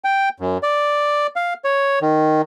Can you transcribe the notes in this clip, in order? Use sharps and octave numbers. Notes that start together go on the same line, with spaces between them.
G5
F#2
D5
F5
C#5
D#3